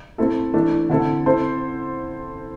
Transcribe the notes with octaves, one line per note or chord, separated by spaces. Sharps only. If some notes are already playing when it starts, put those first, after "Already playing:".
A3 C4 E4 A4
E3 A3 D4
D3 C4 E4 A4
C4 E4 A4 C5